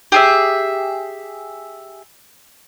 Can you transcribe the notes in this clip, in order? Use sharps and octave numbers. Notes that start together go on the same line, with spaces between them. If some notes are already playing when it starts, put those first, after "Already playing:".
G4 G#4 E5